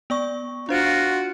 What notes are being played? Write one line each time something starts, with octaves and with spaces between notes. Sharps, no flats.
B3 D5 C#6
D4 F4 F#4 C5 D7